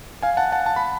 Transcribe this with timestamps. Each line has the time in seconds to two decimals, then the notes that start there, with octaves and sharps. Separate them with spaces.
0.22 F5 G#5
0.37 F#5 A5
0.52 F#5 A5
0.66 A5
0.76 B5